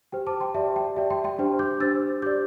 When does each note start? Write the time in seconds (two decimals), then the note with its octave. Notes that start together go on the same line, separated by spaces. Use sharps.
0.12 G4 C5 G5
0.27 A5 D6
0.40 G5 C6
0.55 G4 D5 E5 A5
0.76 G5
0.96 G4 D5 E5 A5
1.10 G5 C6
1.24 G5 C6
1.39 D4 G4 C5
1.59 D6 G6
1.80 D4 G4 C5 E6 A6
2.22 G4 D5 D6 G6